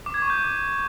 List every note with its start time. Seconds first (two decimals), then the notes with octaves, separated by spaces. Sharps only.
0.06 D6
0.14 G#6
0.22 C#6
0.30 G6
0.38 D6